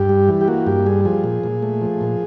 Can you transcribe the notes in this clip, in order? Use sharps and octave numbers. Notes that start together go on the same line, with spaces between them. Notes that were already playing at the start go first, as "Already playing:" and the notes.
Already playing: G2 G4
G3
E3
G4
A#3 F#4
G2 G4
G3 G#4
F3 G#4
A#2
A#2
A3
F3
A#2